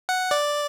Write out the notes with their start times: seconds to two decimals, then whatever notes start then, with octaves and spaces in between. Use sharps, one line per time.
0.09 F#5
0.31 D5